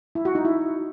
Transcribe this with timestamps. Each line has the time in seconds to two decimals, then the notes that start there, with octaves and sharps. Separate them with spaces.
0.15 E4
0.25 F#4
0.35 D#4
0.45 E4